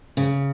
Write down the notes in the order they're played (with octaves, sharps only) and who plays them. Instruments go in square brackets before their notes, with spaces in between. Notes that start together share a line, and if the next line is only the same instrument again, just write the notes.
[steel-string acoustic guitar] C#3